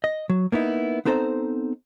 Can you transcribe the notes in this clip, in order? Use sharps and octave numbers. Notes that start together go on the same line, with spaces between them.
D#5
F#3
A#3 B3 D#4 E4
B3 C4 D#4 A4 C5 A#5